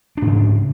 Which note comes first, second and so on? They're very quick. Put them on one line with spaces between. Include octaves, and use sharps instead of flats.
D4 G#2 C#3